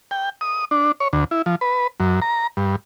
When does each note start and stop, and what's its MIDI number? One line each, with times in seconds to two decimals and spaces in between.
0.11 0.30 79
0.41 0.65 87
0.71 0.92 62
1.00 1.08 73
1.13 1.24 38
1.31 1.42 64
1.46 1.55 53
1.61 1.87 71
2.00 2.20 42
2.22 2.47 82
2.57 2.76 43